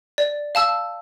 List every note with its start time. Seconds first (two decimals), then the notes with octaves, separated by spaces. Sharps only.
0.18 D5
0.55 F5 A5 E6